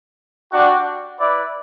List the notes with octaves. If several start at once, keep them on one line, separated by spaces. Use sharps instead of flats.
G3 D4 F#4
E4 B4 D5